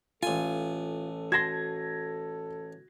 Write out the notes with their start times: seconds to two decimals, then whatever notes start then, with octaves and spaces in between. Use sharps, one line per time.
0.23 A1 F4 A4 G#5
1.32 F#4 A5 C6 G#6 A#6